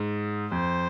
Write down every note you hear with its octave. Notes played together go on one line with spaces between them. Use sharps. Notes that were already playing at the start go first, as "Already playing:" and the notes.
Already playing: G#2
F2 C5